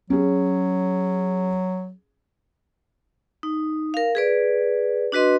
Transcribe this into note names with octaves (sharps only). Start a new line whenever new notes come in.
F#3 C#4 G#4
D#4
A#4 F5
G#4 B4 D5
D4 F#4 B4 D#5 C6